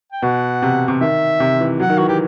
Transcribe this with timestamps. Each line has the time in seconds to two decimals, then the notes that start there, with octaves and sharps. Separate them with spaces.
0.13 G5
0.22 B2 F#5
0.62 C3
0.88 C3
1.01 D#3 E5
1.40 C3
1.61 E3
1.80 F#3 F#5
1.90 D#3
1.98 E3 F#4
2.08 E3 G4